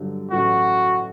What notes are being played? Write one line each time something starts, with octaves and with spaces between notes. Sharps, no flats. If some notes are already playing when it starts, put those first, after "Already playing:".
Already playing: G2 D3 F#3
A1 A2 F#3 A3 F#4